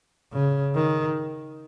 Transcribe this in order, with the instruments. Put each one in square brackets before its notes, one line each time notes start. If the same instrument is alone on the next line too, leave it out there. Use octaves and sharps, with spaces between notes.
[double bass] C#3
D#3